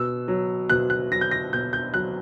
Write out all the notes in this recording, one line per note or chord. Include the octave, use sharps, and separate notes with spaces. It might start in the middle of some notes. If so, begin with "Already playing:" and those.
Already playing: B2 E6
F#3
B2 F#6
F#6
F#3 A#6
G6
A#6
B2 G6
G6
F#3 F#6